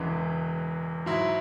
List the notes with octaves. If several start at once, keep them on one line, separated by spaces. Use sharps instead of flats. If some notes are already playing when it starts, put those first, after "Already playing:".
Already playing: E1 E2 C#3 E3 G#3
G#2 F#3 E4